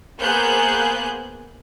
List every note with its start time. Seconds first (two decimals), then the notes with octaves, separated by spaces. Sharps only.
0.21 A#3 B3 G#4 C5 F#6 G6